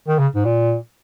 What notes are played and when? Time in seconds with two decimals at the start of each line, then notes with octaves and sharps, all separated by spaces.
0.08 D#3
0.19 C#3
0.35 G#2
0.45 A#2